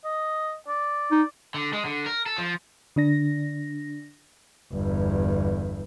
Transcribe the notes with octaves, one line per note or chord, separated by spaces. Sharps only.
D#5
D5
D#4
D3
G#3
D3
A#4
A4
F3
D3 D4 A#6
G1 E2